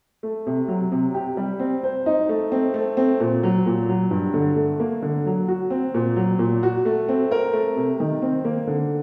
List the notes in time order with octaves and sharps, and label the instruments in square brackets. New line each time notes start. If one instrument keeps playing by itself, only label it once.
[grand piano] A3
C3
F#3
C3
G4
G3
C4
C5
D#4
A3
C4
A3
C4
A#2
F#3
A#2
F#3
G2
D3
A3
A#3
D3
F#3
F#4
C4
A#2
F#3
A#2
F#4
A3
C4
A#4
A3
C3
D#3
C4
A#3
D3